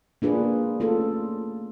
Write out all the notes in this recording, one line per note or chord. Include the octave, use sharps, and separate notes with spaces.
A#3 D4 F4 G#4 B4
A3 C#4 F4 A4